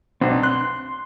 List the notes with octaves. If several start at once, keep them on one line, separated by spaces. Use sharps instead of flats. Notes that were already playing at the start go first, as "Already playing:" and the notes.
B1 C4 D4
C6 F#6